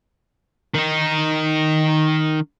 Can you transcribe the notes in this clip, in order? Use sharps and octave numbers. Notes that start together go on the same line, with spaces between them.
D#3 D#4